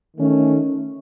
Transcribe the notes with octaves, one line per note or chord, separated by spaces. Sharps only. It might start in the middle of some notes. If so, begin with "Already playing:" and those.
D#3 A3 C#4